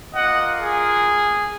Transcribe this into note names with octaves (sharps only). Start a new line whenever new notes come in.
A#3 F4 D#5 F#5
G#4